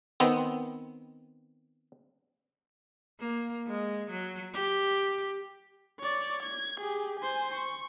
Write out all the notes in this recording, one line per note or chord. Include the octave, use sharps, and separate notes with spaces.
D#3 B3 C4
A#3
G#3
F#3
G4
C#5 D5
G#6
G4 G#4
C5 G#5
C#6